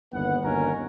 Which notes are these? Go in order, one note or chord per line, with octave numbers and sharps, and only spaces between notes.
G1 D#2 B3 F#5
G1 D#2 B2 C#4 A#4 A#5